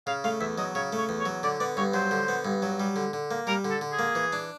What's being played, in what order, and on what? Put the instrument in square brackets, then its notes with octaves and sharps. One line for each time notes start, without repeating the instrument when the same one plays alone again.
[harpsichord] C#3 [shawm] F5
[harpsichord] A3 [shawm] F5
[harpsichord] E2 [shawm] E5
[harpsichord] F#3 [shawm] D#5
[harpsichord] C#3 [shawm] C#5
[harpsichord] A3
[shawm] C#5
[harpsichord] E2
[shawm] C#5
[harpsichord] F#3
[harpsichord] D3 [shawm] D5
[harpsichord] B3 [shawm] D5
[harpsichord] G2 [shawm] C#5
[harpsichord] F#3 [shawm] C5
[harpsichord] D3
B3
G2
F#3
G3
D3
D3
A#3
[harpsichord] G3 [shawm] A#4
[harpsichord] D3
[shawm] A4
[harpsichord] D3
[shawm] G#4
[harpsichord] A#3
E3
D4